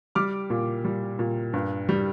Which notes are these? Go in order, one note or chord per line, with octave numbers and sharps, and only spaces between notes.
G3 D6 F6
A#2
G3
A#2
G2
G3